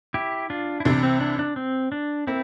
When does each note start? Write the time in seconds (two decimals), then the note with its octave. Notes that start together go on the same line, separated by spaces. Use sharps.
0.14 E4 G4
0.50 D4 F4
0.80 E4
0.85 C2 C3 E3 D4
1.03 C4
1.20 D4
1.39 D4
1.56 C4
1.92 D4
2.27 A#3 C4 E4